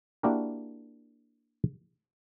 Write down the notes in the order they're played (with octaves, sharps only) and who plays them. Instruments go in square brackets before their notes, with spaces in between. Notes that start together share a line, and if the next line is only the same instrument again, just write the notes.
[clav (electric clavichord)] A#3 D4 E4 F#4 G4 A#4